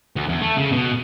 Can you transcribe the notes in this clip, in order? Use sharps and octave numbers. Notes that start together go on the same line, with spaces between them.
D2
E2
A3
C#3
B2